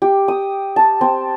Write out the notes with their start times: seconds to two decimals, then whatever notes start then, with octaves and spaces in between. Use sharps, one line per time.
0.02 G4
0.28 D#6
0.76 A5
1.01 C4